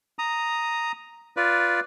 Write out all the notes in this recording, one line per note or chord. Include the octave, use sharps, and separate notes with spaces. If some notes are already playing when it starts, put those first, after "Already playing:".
A#5 D#6
F4 B4 D5